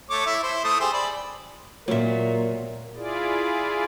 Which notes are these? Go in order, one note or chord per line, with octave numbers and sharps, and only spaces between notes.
A3 C#5 D6
E4 E5
E4 C5
A3 E4 D#6
G4 G#4 C5
D5 B5
A#2 F#3 A#4 E5
E4 F4 G#4 D5